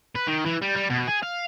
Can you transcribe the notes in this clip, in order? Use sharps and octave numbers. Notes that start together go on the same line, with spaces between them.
B4
D#3
E3
G3
G3
B2
G#4
F5